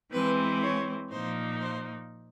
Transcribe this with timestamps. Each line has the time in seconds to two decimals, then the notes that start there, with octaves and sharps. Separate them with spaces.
0.12 E3 G#3 C4 B4
0.62 C#5
1.11 A#2 F3 A#3 D#4 C5
1.60 C5